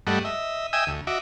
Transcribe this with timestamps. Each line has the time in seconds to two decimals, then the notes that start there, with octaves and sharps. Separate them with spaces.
0.07 G2 G3 A3 D#5 F#5
0.25 D#5 E5
0.73 D#5 E5 G5 G#5 D#6 E6
0.87 D2
1.07 F#4 D#5 E5 D6